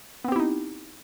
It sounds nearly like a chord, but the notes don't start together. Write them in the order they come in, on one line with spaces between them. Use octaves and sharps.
B3 C4 G4 E4 D#4